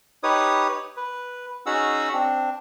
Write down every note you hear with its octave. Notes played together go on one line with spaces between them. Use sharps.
D#4 G4 B4 C#5 D#6
B4
C#4 D#4 F#4 G#4 F#5 E6
C4 D4